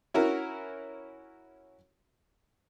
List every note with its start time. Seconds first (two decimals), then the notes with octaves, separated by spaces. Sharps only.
0.14 C#4 E4 F#4 A#4